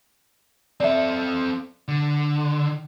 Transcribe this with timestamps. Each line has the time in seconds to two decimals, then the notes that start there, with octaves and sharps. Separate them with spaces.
0.80 C4 A4 D5 E5
1.88 D3